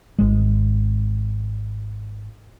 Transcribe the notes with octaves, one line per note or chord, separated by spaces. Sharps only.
G#1 G#3